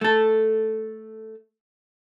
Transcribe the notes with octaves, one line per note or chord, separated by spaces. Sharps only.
A3 A4